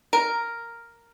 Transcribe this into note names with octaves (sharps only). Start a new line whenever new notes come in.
A#4